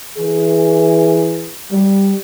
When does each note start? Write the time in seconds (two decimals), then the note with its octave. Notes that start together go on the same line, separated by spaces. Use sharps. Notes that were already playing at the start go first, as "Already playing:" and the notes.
0.18 E3 G#4
1.71 G3